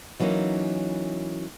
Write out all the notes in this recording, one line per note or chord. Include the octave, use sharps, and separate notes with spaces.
E3 F#3 A#3 C#4 D#4